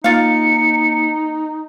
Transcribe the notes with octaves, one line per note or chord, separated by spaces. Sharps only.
A#3 D#4 F4 F5 C#7